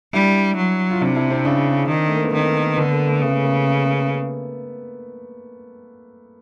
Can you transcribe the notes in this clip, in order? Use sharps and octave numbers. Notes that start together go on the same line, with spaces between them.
G3 D4 E4
F#3
F4
C3 D4 E4
D4 E4
C4 D4
C#3 C4 D4
D#3
A3
A#3
B3
D#3 A#3 C4
D3 A3 B3
A#3
A3
C#3 A#3
A3
A#3